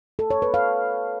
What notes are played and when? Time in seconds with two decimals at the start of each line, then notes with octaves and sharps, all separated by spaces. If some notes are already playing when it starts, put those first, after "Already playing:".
0.19 A4
0.31 C#5
0.42 B4
0.54 F5